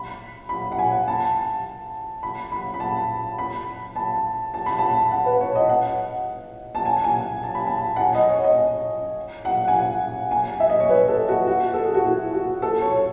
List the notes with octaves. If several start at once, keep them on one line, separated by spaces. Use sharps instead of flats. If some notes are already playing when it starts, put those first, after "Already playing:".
Already playing: B5
B5
F#5
G#5
A5
B5
B5
B5
A5
B5
A5
A5
B5
A5
F#5
B4
C#5
D#5
F#5
A5
G#5
G#5
A5
B5
A5
F#5
G#5
D#5
C#5
D#5
F#5
G#5
F#5
G#5
E5
D#5
C#5
B4
B4
A4
F#4
F#4
A4
G#4
F#4
E4
F#4
A4
C#5